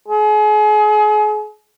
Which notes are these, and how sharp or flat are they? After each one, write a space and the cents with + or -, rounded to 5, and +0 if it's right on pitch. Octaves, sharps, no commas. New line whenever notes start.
G#4 +35